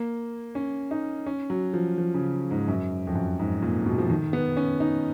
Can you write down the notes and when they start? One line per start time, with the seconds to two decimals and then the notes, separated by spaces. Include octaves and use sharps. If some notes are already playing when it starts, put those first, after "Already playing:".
Already playing: A#3
0.55 C#4
0.91 D#4
1.26 C#4
1.50 F#3
1.73 F3
1.98 F3
2.14 C#3
2.51 G#2
2.68 F#2
3.07 F2
3.15 F#2
3.39 G#2
3.62 A#2
3.86 B2
3.98 F3
4.10 D#3
4.33 B3
4.57 C#4
4.80 D#4